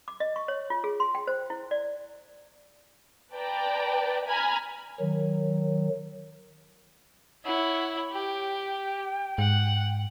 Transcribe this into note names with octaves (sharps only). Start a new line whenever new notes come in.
D6
D#5
C#6
C#5
F4
G#4
C6
G5
C5
E4
D5
B4 D5 G5 A5 A#5
G#5 A#5 B5 F6 G#6
D#3 F#3
E4 C#5 F#5
G4 G5
G#2 F#5